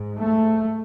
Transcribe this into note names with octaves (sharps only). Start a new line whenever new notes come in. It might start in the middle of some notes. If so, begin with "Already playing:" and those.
Already playing: G#2
A3